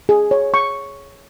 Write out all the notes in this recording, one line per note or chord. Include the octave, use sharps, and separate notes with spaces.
G#4
C#5
C#6